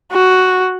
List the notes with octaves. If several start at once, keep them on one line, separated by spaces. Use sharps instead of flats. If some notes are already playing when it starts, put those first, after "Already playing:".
F#4